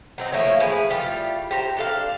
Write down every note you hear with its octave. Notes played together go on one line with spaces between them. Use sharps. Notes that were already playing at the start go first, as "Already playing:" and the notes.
F#3 C4 D#4
F3 A3 A#3 C#5
A2 F3 G#4 B4
A2 G3 F4
G4 C5 A#5
D4 A4 F5